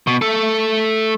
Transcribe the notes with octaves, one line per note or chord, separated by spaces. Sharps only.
B2
A3 A4